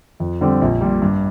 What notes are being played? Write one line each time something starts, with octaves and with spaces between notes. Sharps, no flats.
F2
D3 G3 C4 G4
A#1
A#2 G3
G2